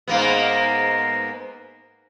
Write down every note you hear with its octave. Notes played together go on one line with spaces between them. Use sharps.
G#2 A#3 B3